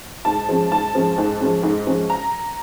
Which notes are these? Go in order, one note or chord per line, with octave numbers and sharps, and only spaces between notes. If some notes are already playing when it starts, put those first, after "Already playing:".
G#2 A5
F3 G#3 C#4
G#2 A5
F3 G#3 C#4
G#2
F3 G#3 C#4
G#2
F3 G#3 C#4
A#5